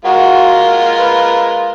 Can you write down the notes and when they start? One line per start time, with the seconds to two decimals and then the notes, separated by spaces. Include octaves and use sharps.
0.05 G#3 F4 F#4 A#4
0.99 B4